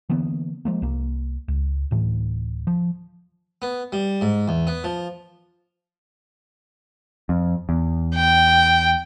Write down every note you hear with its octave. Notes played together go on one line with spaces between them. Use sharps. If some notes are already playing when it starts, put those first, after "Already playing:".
D3 E3 A#3 B3
F3 G#3 A#3
C2 A#3
C#2
D1 A2 E3
F3
B3
G3
G#2
E2
B3
F3
F2
E2
G5